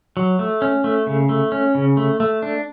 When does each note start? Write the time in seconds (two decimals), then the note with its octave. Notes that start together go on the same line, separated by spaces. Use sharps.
0.17 F#3
0.39 A3
0.62 C#4
0.84 A3
1.07 C#3
1.29 A3
1.52 C#4
1.75 C#3
1.97 A3
2.20 A3
2.42 D4